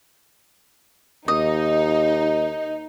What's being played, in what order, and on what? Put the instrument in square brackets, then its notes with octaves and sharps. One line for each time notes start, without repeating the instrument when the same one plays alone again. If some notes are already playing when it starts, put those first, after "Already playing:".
[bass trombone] D#2 [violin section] D#4 [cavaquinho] D#5